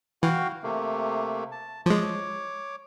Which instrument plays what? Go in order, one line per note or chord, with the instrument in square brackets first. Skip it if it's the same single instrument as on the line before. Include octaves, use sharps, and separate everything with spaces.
[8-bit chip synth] E3 [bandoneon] F#4 F5 G5
[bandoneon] C3 A3 A#3
A5
[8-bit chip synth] F3 G#3 [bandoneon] C#5 D6